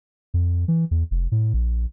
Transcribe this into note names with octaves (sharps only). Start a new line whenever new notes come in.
F2
E3
E2
F1
A2
A#1